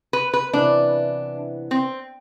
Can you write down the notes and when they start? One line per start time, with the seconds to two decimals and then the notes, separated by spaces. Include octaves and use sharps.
0.13 B4
0.34 B4
0.53 C3 E3 B3 D4 E4 B4
1.71 C4